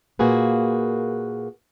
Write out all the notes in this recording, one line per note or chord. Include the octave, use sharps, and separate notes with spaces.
A#2 A#3 F#4 G#4 B4